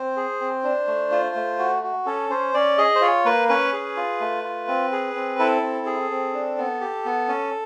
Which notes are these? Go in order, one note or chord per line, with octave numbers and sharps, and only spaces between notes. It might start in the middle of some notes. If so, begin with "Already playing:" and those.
Already playing: C4 C5
G#4
C4
D4
A3
F4
A3
F#4
F#4
C#4 A4
C#4 C5
C#4 D5
G#4 D#5
C5
F4 C#5
A#3 B4
C#4 B4
G#4
F4
A3
F4
C4
G#4
C4
E4 A4
C4
G#4
C4
D4
B3
G4
B3
C#4